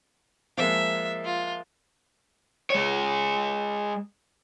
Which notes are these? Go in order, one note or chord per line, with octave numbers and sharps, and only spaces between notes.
F3 G#3 A#3 E5
F4
G#3 C#5